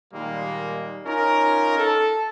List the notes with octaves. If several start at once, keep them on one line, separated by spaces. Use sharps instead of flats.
A#2 D#3 G3 G#3 A#3
C#4 D#4 F4 A#4
A4